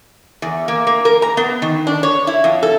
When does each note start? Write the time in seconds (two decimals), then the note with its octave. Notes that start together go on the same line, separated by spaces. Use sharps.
0.42 E2
0.68 A#3
0.87 A#3
1.05 A#4
1.22 A#5
1.37 B3
1.62 D#3
1.87 D4
2.03 C#5
2.27 E4
2.44 F2
2.63 A4